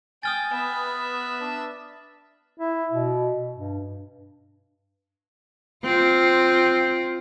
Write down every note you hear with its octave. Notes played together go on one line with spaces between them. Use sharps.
G5 G#5 D#6 F6 A6
B3 B4 E5
D4
E4
B2
G2
C4 F4